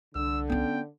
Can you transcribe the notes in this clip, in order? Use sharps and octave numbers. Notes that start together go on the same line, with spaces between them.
C2 D3 E6
B3 C#4 G5